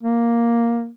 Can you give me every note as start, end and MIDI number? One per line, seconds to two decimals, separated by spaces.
0.03 0.89 58